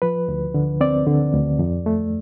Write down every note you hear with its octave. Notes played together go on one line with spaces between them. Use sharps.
F3 B4
D2
D3
C4 D5
D3
D2
F2
A3